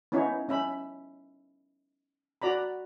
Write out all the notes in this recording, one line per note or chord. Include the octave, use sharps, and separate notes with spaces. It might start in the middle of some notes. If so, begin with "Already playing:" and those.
B3 C#4 D#4 E4 C#5
C#4 E5 B5
F#4 D5 A#5 B5